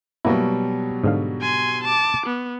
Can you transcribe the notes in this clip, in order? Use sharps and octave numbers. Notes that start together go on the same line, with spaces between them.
B2 F#3 G3 A#3 E4
G#2 D3 F5
G#5 C6
A5 D6
B3